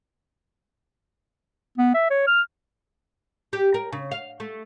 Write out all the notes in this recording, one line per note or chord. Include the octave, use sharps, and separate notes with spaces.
B3
E5
C#5
F6
G4
A#4
C#3
F5
A3